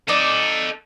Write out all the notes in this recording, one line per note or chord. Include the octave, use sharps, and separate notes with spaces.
D#4 A4 D5 D#5